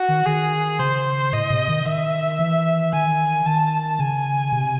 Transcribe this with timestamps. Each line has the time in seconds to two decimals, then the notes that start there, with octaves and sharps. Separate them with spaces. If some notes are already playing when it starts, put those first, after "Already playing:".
Already playing: F#4
0.09 D#3
0.26 D#3 G#4
0.80 C#3 C5
1.33 A2 D#5
1.50 C3
1.68 D#3
1.86 D#3 E5
2.39 E3
2.92 D#3 G#5
3.46 D#3 A5
3.99 C#3 G#5
4.53 C3